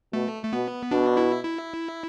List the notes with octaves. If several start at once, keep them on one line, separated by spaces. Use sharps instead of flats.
B2 A3
A3
B2 B3
B2 D4
E4
E4